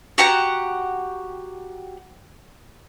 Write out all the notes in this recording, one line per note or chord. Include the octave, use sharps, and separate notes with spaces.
F#4 G4 F#5 A#5